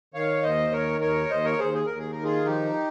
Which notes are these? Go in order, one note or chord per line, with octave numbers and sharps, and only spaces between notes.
D#3 C#5 F5
D#2 C5 D#5
D#3 A#4 C#5
D#2 A#4 C#5
D#2 C5 D#5
A#4 C#5
D#2 G#4 C5
G#4
D#2 A#4
G#4
A#4
D#3
F4 G#4
F3 D#4 G4